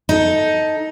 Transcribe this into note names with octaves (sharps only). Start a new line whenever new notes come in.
D#4 A4